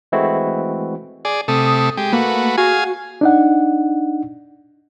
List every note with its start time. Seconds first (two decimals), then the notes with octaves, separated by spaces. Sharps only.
0.12 E3 G#3 A3 C4 E4 F#4
1.25 G#4 D5
1.48 C3 A3 A4 D#6
1.97 G#3 G4
2.13 A3 A#3 F#4 B4
2.58 F#4 G#4 F5 G#5
3.21 D4 D#4 F#5